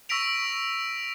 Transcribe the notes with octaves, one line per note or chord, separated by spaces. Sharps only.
C#6 E6 A#6 B6 D7 F7